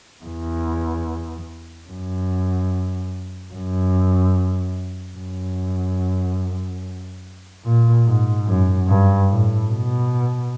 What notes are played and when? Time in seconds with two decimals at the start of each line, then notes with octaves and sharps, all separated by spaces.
0.25 E2
1.88 F#2
3.54 F#2
5.17 F#2
7.65 A#2
8.06 G#2
8.47 F#2
8.88 G2
9.29 A2
9.70 B2